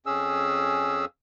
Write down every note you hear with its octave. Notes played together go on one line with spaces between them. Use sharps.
F2 C#4 G#4 E6